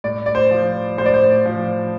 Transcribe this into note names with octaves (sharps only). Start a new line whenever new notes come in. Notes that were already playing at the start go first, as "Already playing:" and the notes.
A2 D5
D5
C5
F3
A2 C5
D5
C5
F3